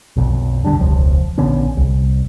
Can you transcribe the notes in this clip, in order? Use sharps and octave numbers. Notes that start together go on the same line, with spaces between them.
B1 F2
D3 G3 D4
E1 C#2 F3
A#1 D3 B3 C#4
C2